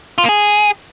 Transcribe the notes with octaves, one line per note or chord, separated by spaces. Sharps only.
F4
A#3
G#4